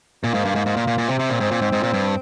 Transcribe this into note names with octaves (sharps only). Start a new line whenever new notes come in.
A#2 A#3
G#2
G2
G#2
G#2
A#2
A#2
A#2
C3 C4
C3
A#2
G#2
A#2
G#2
G#2
A#2
G2